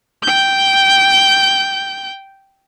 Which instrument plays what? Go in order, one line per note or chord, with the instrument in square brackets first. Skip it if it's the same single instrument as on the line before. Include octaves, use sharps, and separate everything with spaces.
[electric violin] G5 G6